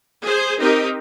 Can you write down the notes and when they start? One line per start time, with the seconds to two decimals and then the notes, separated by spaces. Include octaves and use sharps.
0.23 G#4 C5
0.59 C4 D#4 G4 A#4